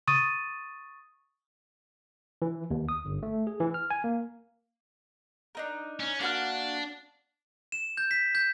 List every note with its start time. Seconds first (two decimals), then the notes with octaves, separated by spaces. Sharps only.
0.08 C#6 D#6 A6 D#7
2.42 E3
2.71 D#2
2.89 D#6
3.05 G1
3.23 A3
3.47 G#4
3.60 E3
3.74 F6
3.90 G#5
4.04 A#3
5.55 D4 D#4 A#4
6.00 C#4
6.21 A#3 D4 F#4 F6
7.72 E7
7.97 G6
8.11 B6
8.35 G6